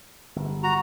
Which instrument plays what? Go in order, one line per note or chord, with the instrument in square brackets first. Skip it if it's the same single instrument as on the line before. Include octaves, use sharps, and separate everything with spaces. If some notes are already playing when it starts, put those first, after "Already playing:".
[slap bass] G1
[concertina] F#4 A#5